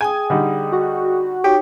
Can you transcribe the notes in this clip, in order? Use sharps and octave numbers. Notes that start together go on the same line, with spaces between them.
G#4 G5 G#5 D#6
D3 G3 D#4
F#4
D#4 G4 C#5